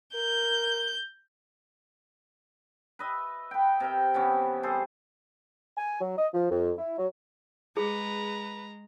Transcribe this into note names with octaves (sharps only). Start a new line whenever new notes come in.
A#4 G6
B4 D#5 E5
B4 G5
C3 A#4 G5
C3 E3 B3 C#4
G3 G#4 A4 C5
G#5
F#3
D#5
F3
F2
E4
F#3
G#3 G#4 B4 A#5